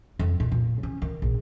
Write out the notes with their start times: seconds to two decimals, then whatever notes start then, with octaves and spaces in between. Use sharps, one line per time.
0.19 F2
0.40 A#2
0.52 A#2
0.83 C#4
1.02 D#3
1.22 A#1